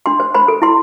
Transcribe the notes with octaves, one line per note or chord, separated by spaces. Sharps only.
D4 C6
C5
C5 B5
A4
E4 C6